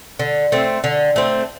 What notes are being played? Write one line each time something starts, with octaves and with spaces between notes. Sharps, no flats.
D3
A3 C4
D3
A3 C4